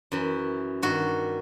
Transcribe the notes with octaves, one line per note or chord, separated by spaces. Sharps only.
F#2 E3
G2 D#3 F#4